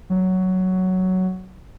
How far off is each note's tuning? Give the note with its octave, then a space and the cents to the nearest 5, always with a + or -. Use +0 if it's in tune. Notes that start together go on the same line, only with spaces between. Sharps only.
F#3 +5